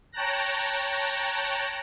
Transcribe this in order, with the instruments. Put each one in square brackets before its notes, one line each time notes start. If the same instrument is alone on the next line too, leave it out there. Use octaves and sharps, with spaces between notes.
[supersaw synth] C#5 G5 A5 A#5 F#6 A#6